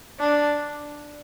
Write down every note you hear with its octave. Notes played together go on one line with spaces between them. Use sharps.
D4